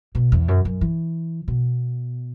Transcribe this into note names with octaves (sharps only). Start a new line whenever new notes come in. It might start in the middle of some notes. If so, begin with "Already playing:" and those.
B2
E2
F#2
F#2
E3
B2